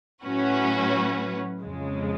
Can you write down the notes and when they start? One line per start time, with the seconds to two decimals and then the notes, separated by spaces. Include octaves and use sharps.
0.24 A2 F#3 C#4 F#4 B4
1.62 F2 C#3 G#3